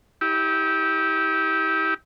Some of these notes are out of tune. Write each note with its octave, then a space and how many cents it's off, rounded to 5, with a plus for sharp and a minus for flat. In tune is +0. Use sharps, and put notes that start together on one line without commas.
E4 -35 G4 +0